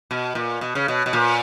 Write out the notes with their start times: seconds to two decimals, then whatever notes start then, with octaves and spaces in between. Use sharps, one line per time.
0.11 B2
0.35 A#2
0.61 B2
0.75 C#3
0.88 B2
1.06 B2
1.13 A#2